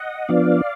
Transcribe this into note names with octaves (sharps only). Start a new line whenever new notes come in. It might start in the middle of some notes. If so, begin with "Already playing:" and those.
Already playing: D#5 F#5
F3 B3 D4 D5 F5